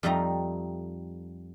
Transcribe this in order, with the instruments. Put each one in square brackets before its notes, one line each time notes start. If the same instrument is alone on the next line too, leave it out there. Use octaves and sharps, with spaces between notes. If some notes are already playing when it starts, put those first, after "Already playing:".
[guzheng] F2 G3 A3 D#4 A#5